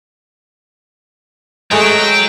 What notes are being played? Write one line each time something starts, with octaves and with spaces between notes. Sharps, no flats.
F#3 G#3 A3 G5